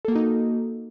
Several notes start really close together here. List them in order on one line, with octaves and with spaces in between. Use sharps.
A4 A#3 F#4 D#4